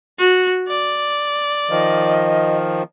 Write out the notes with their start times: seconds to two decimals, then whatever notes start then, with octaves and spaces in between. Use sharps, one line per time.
0.18 F#4
0.68 D5
1.70 D#3 F3 D#5